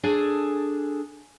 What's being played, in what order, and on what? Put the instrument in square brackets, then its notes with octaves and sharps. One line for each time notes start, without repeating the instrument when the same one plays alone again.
[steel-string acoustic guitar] D4 G#4 A4 G#5